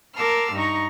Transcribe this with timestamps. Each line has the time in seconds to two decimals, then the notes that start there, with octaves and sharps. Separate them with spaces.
0.16 A#4 A5 C6 D6 E6 F6
0.54 G2 D#4 A#5 C#6